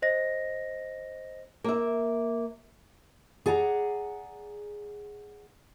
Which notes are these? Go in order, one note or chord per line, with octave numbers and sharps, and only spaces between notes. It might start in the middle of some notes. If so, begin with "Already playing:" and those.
C5 D#5 A#6
A#3 E5
G#4 D5 F#5 A5 A#5